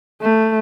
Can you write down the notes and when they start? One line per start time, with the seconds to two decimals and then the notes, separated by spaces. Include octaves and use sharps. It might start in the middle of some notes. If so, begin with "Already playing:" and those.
0.22 A3